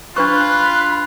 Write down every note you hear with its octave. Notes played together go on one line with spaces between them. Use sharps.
D4 F4 B4 B5 C#6 F#6